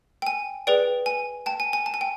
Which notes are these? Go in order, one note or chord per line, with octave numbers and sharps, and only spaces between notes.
G5
G#5
G#4 B4 D5 G5
G#5
G5 A5
G#5
G#5
A5
G#5
G5